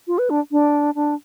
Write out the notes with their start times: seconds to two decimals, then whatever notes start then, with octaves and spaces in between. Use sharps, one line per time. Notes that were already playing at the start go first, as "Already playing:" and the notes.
0.07 F4
0.18 B4
0.30 D4
0.52 D4
0.95 D4